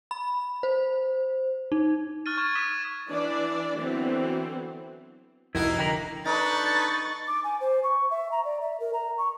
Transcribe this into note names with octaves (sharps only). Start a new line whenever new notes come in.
B5
C5
D#4
C#6 F6 F#6 A6 D#7
C#6 G#6 E7
D6 D#6 F6 B6 D#7 E7
E3 D4 D5
D3 E3 F#3 B3 C4
F1 F3 A#3 D#4 E4 F#4 D#5
D3 G5 A#5 B6 F#7
D4 D#4 A4 B4 C#6 A6
D6
G#5
C5
C#6
E5
A#5
D5
E5
A#4
A#5
C#6